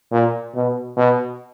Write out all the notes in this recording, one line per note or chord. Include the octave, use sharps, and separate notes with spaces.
A#2
B2
B2